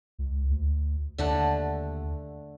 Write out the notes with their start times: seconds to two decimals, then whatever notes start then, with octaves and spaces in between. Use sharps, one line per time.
0.19 C#2
0.50 D2
1.18 D#2 D3 A3 F#5